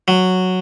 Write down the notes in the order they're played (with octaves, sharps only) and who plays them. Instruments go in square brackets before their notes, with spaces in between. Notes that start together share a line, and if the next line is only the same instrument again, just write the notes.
[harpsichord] F#3